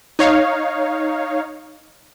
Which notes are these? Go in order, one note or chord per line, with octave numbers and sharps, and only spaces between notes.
D#4 C#5 F5